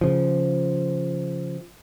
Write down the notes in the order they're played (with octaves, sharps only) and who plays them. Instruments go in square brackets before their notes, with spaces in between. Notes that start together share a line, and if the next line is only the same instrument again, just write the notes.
[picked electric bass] C#3 F3